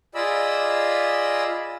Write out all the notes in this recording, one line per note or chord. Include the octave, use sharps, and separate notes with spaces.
F4 G#4 D5 D#5 B5 E6